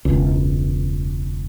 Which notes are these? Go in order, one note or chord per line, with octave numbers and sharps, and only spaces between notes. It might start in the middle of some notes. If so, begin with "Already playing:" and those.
E1 C#2